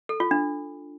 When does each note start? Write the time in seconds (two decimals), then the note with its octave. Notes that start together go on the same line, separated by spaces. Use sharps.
0.09 A4
0.20 F4
0.31 D4